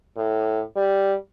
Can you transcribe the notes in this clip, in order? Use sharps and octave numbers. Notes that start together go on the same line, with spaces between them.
A2
G3